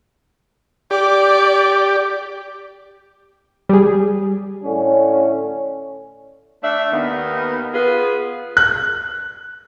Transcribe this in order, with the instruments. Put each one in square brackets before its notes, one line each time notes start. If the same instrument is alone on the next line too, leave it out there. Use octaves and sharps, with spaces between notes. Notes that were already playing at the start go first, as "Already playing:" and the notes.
[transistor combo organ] G4 [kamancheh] D5
[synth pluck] G3 G#4
[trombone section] A2 D3 C#4
[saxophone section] A3 D4 E5
D#2 D#3 B3
B3 F4 G#4 B4
[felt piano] F#6